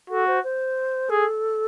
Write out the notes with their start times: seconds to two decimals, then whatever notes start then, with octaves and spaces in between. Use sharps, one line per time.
0.10 F#4 A4
0.27 C5
0.44 C5
1.10 G#4 A4